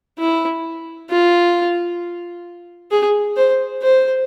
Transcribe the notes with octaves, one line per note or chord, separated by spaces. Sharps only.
E4
F4
G#4
C5
C5